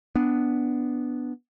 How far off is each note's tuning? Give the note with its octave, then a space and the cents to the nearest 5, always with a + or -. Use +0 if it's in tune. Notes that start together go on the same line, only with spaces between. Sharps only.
B3 +0 D4 +0